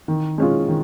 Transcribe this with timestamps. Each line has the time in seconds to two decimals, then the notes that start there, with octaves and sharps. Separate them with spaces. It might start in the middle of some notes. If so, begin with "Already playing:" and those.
0.08 D#3
0.38 G#3 C#4 F4
0.68 D#3